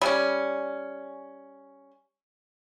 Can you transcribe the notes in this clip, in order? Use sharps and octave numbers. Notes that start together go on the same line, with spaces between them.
G3 C#4